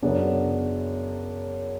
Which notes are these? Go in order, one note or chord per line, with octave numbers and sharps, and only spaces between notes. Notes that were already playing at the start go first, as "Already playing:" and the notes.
F#2 C#3 F#3 B3 D4